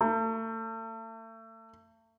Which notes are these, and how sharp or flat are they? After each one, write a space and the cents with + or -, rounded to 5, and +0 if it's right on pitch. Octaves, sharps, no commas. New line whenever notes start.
A3 +35